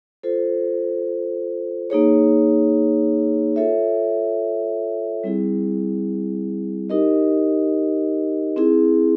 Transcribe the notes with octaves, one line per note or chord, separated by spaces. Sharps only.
F4 A4 C5
A#3 D#4 G#4 C#5
F4 A4 C#5 E5
G3 C4 E4 G#4
D#4 G4 A#4 D#5
C4 E4 G#4